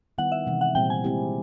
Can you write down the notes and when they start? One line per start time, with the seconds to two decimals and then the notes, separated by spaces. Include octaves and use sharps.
0.18 D#3 G3 B3 E4 F#5
0.32 E5
0.47 C3 E3 G#3
0.61 F#5
0.75 A#2 G3 C4 G5
0.90 G#5
1.04 G#3 C4 E4 G4